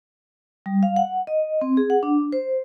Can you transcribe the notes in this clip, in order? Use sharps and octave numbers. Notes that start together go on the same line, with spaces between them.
G3
F5
F#5
D#5
C4
G#4
F#5
D4
C5